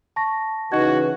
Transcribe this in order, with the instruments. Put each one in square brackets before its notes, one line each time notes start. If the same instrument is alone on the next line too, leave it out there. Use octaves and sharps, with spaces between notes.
[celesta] A5 C#6 A#6
[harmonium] C#3 E3 [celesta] D#4 D#5 G#6 [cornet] F#4